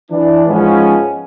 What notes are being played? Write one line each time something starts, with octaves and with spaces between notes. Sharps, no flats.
E3 D4
G#2 F3 G#3 B3 C#4